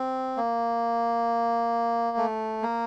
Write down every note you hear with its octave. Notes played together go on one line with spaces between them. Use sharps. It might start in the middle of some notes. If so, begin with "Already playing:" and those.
Already playing: C4
A#3
A3
A#3